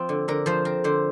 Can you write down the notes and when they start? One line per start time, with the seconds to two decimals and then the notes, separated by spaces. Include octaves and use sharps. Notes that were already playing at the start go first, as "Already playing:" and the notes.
Already playing: F3 C4
0.09 D3
0.28 D3 A#4
0.46 F3 C5
0.65 C4 A#4
0.84 D3 C5